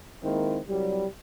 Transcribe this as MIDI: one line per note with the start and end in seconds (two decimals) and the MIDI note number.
0.23 0.58 51
0.23 0.58 56
0.23 0.58 58
0.23 0.58 60
0.23 0.58 64
0.68 1.06 36
0.68 1.06 54
0.68 1.06 55